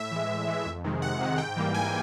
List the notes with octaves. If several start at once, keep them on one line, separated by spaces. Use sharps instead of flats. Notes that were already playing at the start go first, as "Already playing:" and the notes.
Already playing: A2 E5
E3 G#3
A2
E3 G#3
F2
C3 D#3 G#3
F2 F#5
C3 D#3 G#3
G#2 G5
E3 G3 A#3
G#2 G#5